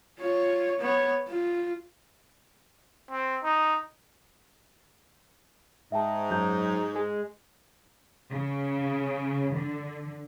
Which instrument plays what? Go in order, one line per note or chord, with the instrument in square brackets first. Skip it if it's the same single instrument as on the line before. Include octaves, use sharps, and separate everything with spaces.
[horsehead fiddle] F4 C#5
B3 C#5
F4
[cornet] C4
D#4
[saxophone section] G#2 [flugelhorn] D#4 [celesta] E5 G5 A5
[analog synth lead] F#2 [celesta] A#5 G6
[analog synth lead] G#3
[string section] C#3
D3